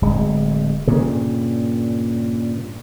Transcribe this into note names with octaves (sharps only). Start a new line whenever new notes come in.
D1 G#3
G2 A#2 C#3